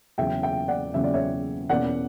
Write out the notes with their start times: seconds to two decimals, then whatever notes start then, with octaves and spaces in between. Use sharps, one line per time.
0.18 E2 C#3 F#3 C#4 E5 G5
0.43 E5 G5
0.68 D5 F#5
0.94 E2 C#3 F#3 C#4 E5
1.04 D5
1.14 C#5 E5
1.69 E2 B2 A#3 C#4 D5 F#5